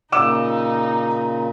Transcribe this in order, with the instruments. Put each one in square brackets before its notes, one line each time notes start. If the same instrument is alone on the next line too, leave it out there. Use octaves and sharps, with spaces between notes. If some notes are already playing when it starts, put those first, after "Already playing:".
[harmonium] A#2 C#3 [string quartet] D#4 [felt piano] D6 E6 E7